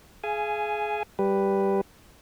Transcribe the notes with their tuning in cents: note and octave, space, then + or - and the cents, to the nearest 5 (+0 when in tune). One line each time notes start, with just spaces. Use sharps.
G#4 +20 F5 -35 G#5 +0
G3 +0 G4 +0 B4 +0